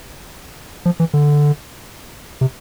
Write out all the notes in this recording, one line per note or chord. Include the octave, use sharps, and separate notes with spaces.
F3
E3
D3
C3